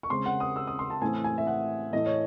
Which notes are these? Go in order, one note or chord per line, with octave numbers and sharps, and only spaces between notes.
C#6
C#3 G#3 C4 C6
F#5
D#6
E6
D#6
C6
A5
A2 E3 A3 C4 G#5
G#5
E5
F#5
A2 E3 A3 D#5
C#5